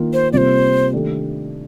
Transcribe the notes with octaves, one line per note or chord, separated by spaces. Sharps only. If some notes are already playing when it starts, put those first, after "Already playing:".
Already playing: D#3 A#3 F4
C5
C3 G3 A#3 F4 C5 D5
D#3 A3 D4 G4